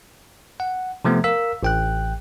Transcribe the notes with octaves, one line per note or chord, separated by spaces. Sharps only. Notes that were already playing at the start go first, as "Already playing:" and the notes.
F#5
C3 F3 A3 B3
A#4 F5 E6 B6
A1 G5 F#6